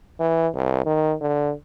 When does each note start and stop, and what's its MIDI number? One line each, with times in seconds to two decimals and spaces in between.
0.19 0.48 52
0.54 0.85 36
0.86 1.14 51
1.21 1.53 50